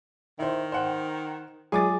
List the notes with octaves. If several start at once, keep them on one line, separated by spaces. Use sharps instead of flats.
D#3 E4 C5
C5 F#5 G5
F#3 G#3 F4 G#4 G#5 D6 A6